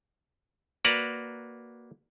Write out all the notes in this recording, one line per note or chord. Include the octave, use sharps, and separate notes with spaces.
A#3 F#4 B4 D5 A#5